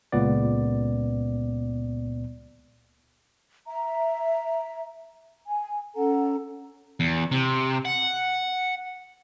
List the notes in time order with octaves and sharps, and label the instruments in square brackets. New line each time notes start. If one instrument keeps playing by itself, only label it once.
[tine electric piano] C#2 A#2 B3 D5
[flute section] E5 A#5
G#5
C#4 A4 F#5 A#5
[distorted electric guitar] E2
C3
F#5